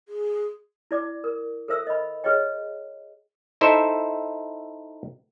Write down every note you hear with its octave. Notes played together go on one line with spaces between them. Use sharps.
G#4
E4 D5 D6
A#4
A4 A#4 C5 E5 E6
D#5 B5
G#4 B4 C#5 D#5 G5
D#4 E4 A4 C5 E5